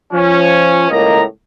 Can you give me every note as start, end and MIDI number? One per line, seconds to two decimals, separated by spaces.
0.13 0.89 53
0.13 0.89 61
0.90 1.23 37
0.90 1.23 45
0.90 1.23 58
0.90 1.23 75
0.90 1.23 82